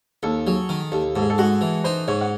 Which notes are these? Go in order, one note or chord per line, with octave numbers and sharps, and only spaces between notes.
D#2 A4
F#3 G#4
D#3
D#2 A4
G#2 A4
G#4
A4
G#3 F#4
E3
D#4 C5
G#2 C#5
F#5